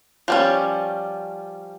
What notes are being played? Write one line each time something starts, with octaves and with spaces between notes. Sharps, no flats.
F3 G3 C#4